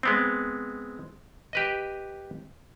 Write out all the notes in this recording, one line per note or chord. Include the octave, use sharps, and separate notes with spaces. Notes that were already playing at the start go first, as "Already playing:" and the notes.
G#3 B3 C4
G4 B4 D#5